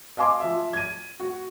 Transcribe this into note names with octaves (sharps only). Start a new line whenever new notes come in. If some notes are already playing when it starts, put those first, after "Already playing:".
D#5 F5 G#5 C6 D6
F3 E5
G#6 D#7
F#4